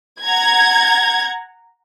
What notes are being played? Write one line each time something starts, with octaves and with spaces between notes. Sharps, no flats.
F#5 A#5 G#6